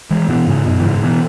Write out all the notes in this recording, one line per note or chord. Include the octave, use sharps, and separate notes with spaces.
E3 G#3
B2 E3
G#2 C#3
F#2 B2
E3
G#2 C#3
B2 E3